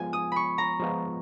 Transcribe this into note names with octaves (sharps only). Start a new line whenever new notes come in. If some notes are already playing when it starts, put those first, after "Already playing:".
Already playing: F3 G#3 B3 F4 G#5
D#6
B5 C#6
A#5
F3 G#3 B3 F4